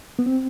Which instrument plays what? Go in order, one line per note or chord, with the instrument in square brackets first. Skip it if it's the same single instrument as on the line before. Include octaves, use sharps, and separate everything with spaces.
[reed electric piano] B3
C4